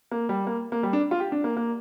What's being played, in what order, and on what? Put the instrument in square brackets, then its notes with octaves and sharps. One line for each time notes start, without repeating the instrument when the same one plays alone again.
[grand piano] A#3
G3
A#3
A#3
G3
D4
F4
G4
D4
A#3
A#3